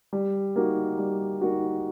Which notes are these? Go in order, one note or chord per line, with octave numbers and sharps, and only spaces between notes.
G3
A#3 D#4 F#4
G3
A#3 D#4 F#4